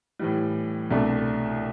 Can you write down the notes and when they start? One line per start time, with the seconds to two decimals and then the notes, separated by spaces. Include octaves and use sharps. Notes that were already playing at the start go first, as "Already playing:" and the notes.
0.19 A2 E3 G3
0.91 C2 B2 A3 D4